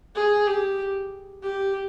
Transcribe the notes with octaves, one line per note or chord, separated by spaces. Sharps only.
G#4
G4
G4